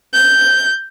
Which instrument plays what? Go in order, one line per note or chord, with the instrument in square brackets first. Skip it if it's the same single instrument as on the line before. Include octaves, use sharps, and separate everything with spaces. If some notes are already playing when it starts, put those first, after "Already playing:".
[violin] G6